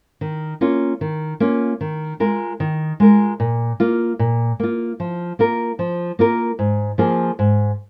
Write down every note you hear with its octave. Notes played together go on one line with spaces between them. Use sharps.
D#3
A#3 C#4 F4
D#3
A#3 C#4 F4
D#3
G#3 F4 A#4
D#3
G#3 F4 A#4
A#2
A#3 F4
A#2
A#3 F4
F3
A#3 F4 A#4
F3
A#3 F4 A#4
G#2
F3 A#3 F4 G#4
G#2